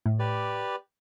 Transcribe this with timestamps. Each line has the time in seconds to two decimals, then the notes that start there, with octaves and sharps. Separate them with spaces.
0.06 A2
0.19 G4 B4 D5